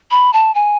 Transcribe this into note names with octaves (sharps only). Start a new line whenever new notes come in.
B5
A5
G#5